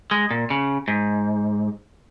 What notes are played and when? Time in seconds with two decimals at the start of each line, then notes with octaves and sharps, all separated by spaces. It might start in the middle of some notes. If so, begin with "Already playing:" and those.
0.11 G#3
0.31 A#2
0.50 C#3
0.88 G#2